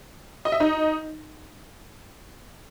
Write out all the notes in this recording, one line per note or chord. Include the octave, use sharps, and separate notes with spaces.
D#5
E5
D#4 D#5